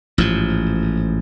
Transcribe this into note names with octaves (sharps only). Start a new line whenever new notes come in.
A1 G#2 F3